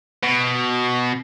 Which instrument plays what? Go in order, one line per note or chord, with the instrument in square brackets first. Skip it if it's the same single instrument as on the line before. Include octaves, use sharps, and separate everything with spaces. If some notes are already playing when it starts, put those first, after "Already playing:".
[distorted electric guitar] B2